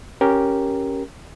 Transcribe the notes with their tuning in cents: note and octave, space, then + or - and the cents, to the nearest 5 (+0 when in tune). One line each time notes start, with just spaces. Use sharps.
C#4 +0 G4 -5 A#4 +0